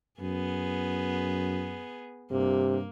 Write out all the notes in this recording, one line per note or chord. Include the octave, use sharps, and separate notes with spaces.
F#2 B3 G#4
G2 C3 A#3